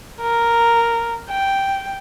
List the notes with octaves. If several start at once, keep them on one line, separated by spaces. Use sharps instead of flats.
A#4
G5